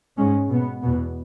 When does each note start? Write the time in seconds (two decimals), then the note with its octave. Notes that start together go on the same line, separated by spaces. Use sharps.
0.16 G#2 G#3 C#4
0.49 B2 B3
0.82 E2 B2 B3